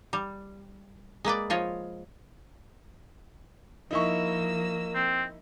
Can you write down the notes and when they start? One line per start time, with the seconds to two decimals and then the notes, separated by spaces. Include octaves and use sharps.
0.13 G3
1.25 G#3 A#3 B4 D5
1.50 F3 F4 C#5 D#5
3.91 F3 A#3 D#4 E4 C#6 E6
4.95 C4